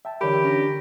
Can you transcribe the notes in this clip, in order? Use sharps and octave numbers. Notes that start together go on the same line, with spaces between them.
E5 G5 A5
D3 E3 G3 G4 A#4 C#5 D5 B5
C#4 D4 A#5 A#6